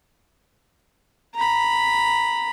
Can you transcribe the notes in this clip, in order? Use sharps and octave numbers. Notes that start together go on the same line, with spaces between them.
A#5 B5